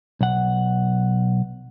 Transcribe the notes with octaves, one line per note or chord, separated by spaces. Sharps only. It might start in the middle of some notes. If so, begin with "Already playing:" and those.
B1 F#5